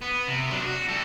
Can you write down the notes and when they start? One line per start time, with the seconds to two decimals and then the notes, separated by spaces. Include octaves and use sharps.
0.01 B3
0.28 C3
0.51 F#3 D4
0.65 F#4
0.89 G3 A4